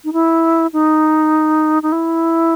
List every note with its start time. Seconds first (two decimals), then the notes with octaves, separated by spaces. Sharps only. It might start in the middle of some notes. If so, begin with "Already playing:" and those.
0.05 D#4
0.13 E4
0.73 D#4
1.83 D#4
1.92 E4